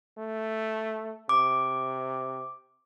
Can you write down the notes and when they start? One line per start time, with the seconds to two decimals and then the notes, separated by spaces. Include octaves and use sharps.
0.18 A3
1.29 C3 D6